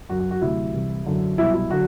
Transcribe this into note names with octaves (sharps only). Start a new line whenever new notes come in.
F#2 F#3 F#4
F#4
F#4
D2 C3 F#3 E4
C2 C3 E3
F#2 D3 F#3
C2 B2 F#3 E4
E4
D3 F#3 F#4